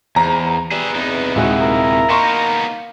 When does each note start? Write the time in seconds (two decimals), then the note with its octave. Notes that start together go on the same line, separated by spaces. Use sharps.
0.16 E2 G#2 A#5
0.71 G3 B3 G#4 E5
0.95 E2 C3 D#4
1.35 D#1 G#3 E4 F#4
1.61 A#4
2.10 A#3 B3 D#4 C6 C#6 E7